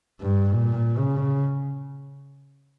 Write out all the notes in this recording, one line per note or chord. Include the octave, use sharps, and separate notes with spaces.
G2
A#2
C#3